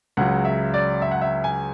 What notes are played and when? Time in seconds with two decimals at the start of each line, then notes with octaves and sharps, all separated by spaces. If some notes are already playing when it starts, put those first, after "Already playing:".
0.17 C#2 C#3 F#3 F#5
0.45 E5
0.74 D5
1.02 E5
1.12 F#5
1.21 E5
1.44 G#5